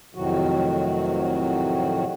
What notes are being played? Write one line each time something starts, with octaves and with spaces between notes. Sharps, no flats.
F2 A2 C3 D#3 F#3 F#4